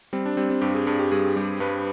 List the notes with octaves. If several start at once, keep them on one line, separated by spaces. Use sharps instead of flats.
G3 C4
D4
G3 C4
C4
G2 G4
G#4
G2 G#4
G4
G2 G#4
G3 G4
G2 B4